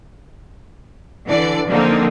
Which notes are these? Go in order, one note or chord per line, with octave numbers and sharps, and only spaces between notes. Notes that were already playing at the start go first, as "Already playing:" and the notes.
D3 E3 D5
D3 F3 A#3 C4 D#4